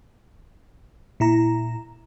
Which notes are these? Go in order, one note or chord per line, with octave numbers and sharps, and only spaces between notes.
A#2 E4 A#5